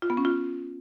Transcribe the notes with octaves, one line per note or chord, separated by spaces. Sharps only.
F4
B3
C#4
F4